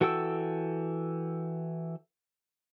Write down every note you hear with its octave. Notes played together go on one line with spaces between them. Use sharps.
E3 F#4 A4 G5 E6